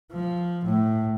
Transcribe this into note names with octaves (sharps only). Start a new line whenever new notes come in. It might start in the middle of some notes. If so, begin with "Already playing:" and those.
F3
A2